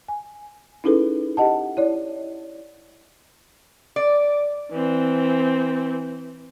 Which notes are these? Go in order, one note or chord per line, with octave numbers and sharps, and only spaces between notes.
G#5
C#4 D#4 E4 G#4 A4 B4
G4 D#5 F#5 A5
E4 C#5 D5
D5
E3 C4